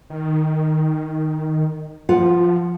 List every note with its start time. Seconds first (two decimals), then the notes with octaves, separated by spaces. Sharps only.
0.10 D#3
2.09 F3 F4 F#5